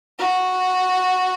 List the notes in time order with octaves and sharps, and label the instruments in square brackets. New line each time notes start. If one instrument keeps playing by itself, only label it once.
[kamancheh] F#4